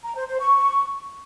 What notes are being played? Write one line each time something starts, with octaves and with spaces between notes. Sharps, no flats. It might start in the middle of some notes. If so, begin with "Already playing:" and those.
A#5
C5
C5
C#6